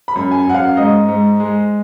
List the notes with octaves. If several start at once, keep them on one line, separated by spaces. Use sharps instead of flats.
B5
F#2
G#5
F#2 F#5
F5
G#2 D#5
G#2
G#3